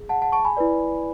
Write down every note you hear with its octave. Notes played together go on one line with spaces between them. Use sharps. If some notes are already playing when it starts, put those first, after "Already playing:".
Already playing: G#4
F#5 A5
F#5 A5
A5 C#6
G#5 B5
E4 B4 D5